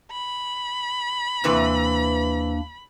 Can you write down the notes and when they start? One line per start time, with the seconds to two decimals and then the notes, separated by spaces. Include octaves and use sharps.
0.12 B5
1.44 D#2 C3 E3 A#3 D4 B4